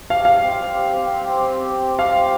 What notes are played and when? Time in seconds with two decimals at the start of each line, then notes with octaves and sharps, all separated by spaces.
0.10 G4 F5
0.25 F5
0.42 C4
0.73 G4
1.04 C4
1.37 G4
1.67 C4
1.99 G4 F5